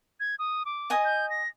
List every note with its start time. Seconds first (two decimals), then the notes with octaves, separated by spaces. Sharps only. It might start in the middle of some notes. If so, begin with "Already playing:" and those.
0.20 G#6
0.39 D#6
0.65 D6
0.90 D#5 G#5 D#6
1.05 G6
1.30 A#6